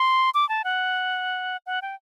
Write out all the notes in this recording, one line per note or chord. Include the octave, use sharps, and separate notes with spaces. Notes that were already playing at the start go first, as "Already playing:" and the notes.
Already playing: C6
D6
A5
F#5
F#5
G5